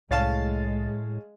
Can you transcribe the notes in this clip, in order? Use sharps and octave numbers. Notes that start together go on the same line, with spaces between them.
C2 A2 G#3 C#4 F5 A5 A6